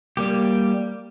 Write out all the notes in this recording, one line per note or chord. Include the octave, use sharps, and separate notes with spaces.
G3 A#3 G4